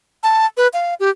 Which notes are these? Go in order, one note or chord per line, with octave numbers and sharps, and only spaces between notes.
A5
B4
F5
G4